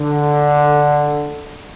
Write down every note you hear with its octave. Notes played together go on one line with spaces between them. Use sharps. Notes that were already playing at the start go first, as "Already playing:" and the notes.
Already playing: D3